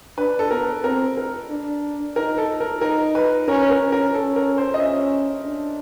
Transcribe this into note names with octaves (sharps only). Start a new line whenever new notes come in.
D4 B4
A4
B3 A#4
C4 A#4
A#4
D4
D#4 A#4
A4
A#4
D#4 A#4
B4
C#4 A#4
A#4
C#4
A#4
C#4 A4
A#4
C5
D#5
C#4 E5
D4